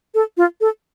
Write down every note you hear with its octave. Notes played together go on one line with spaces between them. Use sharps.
A4
F4
A4